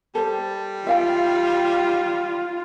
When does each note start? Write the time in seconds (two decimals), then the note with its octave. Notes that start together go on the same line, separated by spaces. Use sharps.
0.15 G3 A4 C5
0.87 F4 E5 F5 G5